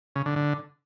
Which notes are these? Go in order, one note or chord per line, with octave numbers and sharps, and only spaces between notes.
C#3
D3
D3